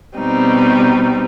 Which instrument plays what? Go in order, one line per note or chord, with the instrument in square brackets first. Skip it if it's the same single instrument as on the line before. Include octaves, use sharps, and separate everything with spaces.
[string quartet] B2 G3 C4 D#4